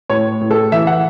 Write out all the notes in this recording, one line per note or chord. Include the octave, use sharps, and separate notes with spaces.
A2 C#5
A2
A4
E3 E5
F#5